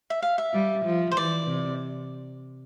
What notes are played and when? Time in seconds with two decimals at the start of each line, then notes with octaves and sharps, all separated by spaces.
0.10 E5
0.22 F5
0.38 E5
0.53 G3
0.85 F3
1.12 C5
1.17 E3 D5
1.48 C3